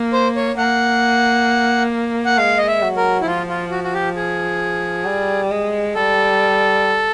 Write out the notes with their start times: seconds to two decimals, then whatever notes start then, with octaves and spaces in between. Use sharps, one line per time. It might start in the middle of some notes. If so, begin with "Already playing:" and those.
Already playing: A#3
0.13 C5
0.36 C#5
0.57 A#3 F#5
2.25 F#5
2.37 G#3 F5
2.58 D#5
2.67 E5
2.82 F#3
2.96 A#4
3.21 E4
3.26 F3 F4
3.49 F4
3.71 F#4
3.84 F#4
3.93 G4
4.16 G#4
5.05 G3
5.51 G#3
5.95 G3 A4